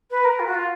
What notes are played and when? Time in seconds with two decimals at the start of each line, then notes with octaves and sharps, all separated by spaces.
0.10 B4
0.24 A#4
0.39 F4
0.46 F#4
0.53 F4